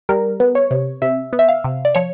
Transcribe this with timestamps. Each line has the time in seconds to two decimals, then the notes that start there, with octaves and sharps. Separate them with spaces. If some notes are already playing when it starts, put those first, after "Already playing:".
0.09 G3 A#4
0.40 B3
0.55 C#5
0.71 C3
1.02 C3 E5
1.33 B3
1.39 E5
1.49 F5
1.64 C3
1.85 D5
1.95 F3 C#5